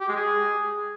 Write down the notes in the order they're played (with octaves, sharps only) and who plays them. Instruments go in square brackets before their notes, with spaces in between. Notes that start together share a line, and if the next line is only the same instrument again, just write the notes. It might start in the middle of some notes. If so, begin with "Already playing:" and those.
[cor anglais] G4
G#3
G#4